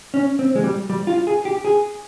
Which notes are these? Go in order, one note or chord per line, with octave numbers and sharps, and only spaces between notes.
C#4
C4
G#3
G3
G3
F4
G#4
G4
G#4